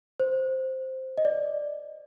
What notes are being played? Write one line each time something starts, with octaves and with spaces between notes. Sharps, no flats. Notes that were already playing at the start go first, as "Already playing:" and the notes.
C5
D#5
D5